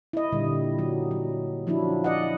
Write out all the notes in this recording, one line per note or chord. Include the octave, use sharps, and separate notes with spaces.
E4 D#5
A#2 D3 G3
F#3
F#3
F3 F#3 D4 E4
D5 D#5 F#5